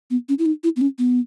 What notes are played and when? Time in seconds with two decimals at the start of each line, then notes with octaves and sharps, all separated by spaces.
0.10 B3
0.29 C#4
0.39 E4
0.46 D#4
0.64 E4
0.76 B3
0.81 C#4
0.99 B3